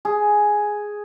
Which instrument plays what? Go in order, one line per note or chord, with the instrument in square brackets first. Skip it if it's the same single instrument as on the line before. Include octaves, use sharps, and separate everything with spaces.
[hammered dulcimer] G#4